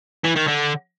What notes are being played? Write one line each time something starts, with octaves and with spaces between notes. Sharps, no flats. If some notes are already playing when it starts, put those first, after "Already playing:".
E3
D#3
D3